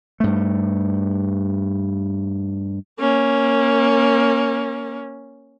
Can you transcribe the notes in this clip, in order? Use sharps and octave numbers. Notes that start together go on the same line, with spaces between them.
G2 A3
A#3 C#4